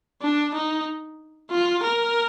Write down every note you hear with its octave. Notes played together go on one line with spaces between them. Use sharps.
D4
D#4
F4
A#4